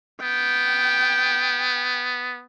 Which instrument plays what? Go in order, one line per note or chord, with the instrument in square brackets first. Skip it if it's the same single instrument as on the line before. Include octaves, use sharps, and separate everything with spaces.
[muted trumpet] B3 [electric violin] G5